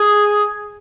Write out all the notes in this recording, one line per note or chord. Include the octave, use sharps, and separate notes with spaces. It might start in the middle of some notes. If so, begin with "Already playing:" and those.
Already playing: G#4